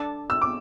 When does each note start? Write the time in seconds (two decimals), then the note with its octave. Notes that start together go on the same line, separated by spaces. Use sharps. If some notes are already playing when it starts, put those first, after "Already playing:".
Already playing: D4 A4 D5 A5
0.30 E6
0.42 D6